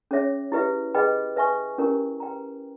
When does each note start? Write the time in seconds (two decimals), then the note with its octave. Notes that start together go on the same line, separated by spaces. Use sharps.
0.11 C#4 G#4 C#5 E5
0.52 E4 G4 B4 E5
0.94 G#4 B4 D#5 G5 B5
1.36 B4 E5 G#5 C#6
1.78 C#4 E4 G4 A#4
2.20 B4 G5 A#5